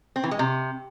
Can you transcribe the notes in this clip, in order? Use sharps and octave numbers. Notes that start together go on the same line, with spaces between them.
C4
E3
G#3
C3